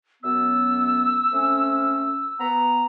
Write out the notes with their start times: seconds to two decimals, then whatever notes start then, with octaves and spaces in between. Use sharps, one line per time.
0.23 F#2 B3 E6
1.32 A3 C4 C#4
2.40 B3 A#5